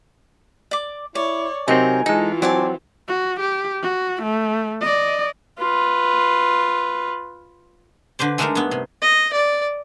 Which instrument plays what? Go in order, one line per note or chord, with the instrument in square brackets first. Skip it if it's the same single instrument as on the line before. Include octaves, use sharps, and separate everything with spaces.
[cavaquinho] D5 D6
[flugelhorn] E4 [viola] C#5 [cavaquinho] D5
[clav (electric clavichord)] C3 F#3 C4 [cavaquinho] D#4 [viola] A#4 [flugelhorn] G#5
[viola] E3 F4 [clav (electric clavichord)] G#3 D#4 [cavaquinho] A4
[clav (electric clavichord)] F#3 [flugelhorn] C4 [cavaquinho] D5 G#5 A5
[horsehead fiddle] F#4
G4
F#4
A3
D5 D#5
[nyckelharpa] F4 B4
[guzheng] D3 B4 C5 D5
G#3 A3 D4 D#4 A4 A#4
G2 B3
C3
[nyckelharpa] D#5
D5